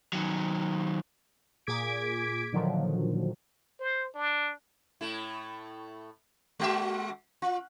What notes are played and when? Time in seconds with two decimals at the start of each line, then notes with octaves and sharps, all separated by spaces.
0.13 D#3 F#3
1.67 A#2 G#4 D6 G#6 B6 D7
2.53 A#2 D3 D#3 F3 F#3
3.80 C5
4.15 D4
5.01 A2 A3 E4
6.60 G#3 F#4 E5
7.42 F4